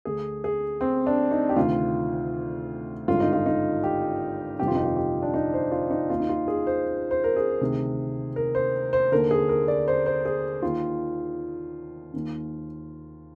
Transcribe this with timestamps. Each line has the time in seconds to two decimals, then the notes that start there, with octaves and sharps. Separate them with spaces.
0.05 D2 D3 G#4
0.44 G#4
0.81 C4
1.07 D4
1.31 D#4
1.49 G4
1.56 D2 C3 D#3 F4
3.08 G#1 G2 D3 F4
3.20 D#4
3.33 F4
3.46 D#4
3.84 G4
4.59 G1 F2 C3 D#3 G4
4.68 F4
4.75 D#4
4.84 F4
4.97 G4
5.22 D4
5.34 D#4
5.54 C5
5.72 F4
5.90 D#4
6.10 D#2 D#3 F4
6.20 D#4
6.29 F4
6.48 G#4
6.67 C5
7.11 C5
7.24 A#4
7.36 G#4
7.61 D2 C3 D#3
8.36 A#4
8.55 C5
8.93 C5
9.12 D#2 D3 A#4
9.31 G#4
9.49 A#4
9.68 D5
9.88 C5
10.06 C5
10.25 G#4
10.62 D#2 D#3 F4
12.13 D#2 D#3